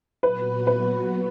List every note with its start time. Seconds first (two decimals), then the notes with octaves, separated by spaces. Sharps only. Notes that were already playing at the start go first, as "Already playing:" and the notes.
0.22 A#2 F#3 B3 F#4 B4
0.67 B4